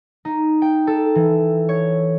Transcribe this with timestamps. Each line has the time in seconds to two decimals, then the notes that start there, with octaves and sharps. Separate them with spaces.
0.25 D#4
0.62 G5
0.87 A4
1.15 E3
1.69 C#5